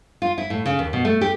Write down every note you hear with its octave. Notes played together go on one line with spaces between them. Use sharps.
F4
E4
A2
C#3
D#2
B2
A3
G4